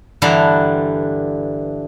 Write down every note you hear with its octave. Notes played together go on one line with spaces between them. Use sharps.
G2 D3 E3 D4 A5 A#5